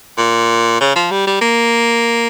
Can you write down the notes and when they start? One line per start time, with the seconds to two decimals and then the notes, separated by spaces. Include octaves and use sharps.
0.18 A#2
0.81 C#3
0.96 F3
1.11 G3
1.27 G3
1.41 A#3